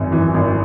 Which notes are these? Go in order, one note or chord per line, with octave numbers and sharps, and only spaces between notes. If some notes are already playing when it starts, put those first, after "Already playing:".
Already playing: G#1 F#2
E3
G#1